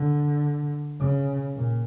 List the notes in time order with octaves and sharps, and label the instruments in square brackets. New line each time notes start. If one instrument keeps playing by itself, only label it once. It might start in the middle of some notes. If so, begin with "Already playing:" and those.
Already playing: [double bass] D3
C#3
A#2